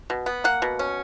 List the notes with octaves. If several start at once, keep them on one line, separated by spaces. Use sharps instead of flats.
B2
B3
A#3 F#5
B2
C#4